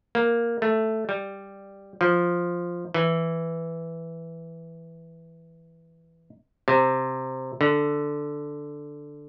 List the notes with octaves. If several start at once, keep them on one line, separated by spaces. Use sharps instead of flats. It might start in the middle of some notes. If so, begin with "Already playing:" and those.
A#3
A3
G3
F3
E3
C3
D3